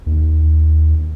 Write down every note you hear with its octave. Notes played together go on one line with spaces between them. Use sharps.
D#2